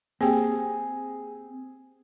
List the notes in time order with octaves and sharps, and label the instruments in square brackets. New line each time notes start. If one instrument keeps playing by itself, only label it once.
[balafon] A#3 G4 G5 [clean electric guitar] C4 [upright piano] G#4